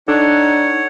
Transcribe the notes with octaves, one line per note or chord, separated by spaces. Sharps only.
D4 D#4 A4 C#5 F#5